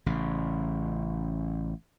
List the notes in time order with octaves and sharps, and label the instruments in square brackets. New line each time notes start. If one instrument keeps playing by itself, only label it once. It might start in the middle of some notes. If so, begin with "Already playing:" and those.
[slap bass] A1 C#3